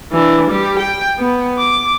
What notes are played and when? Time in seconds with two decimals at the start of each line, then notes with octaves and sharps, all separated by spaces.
0.12 E3 D4
0.50 G3 G4
0.79 G5
1.19 B3
1.59 D6